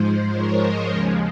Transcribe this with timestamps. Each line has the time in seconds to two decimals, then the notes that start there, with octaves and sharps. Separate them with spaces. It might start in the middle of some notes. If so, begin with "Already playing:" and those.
Already playing: G#2 F3 G#3 C5
0.34 A#4 C#5
0.61 C5 D#5
0.90 D#2 C#3 F3 G#3 A#4 C#5